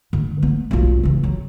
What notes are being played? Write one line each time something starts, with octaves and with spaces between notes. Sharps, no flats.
D3
B3
B1 F4
C#3 E3
F#3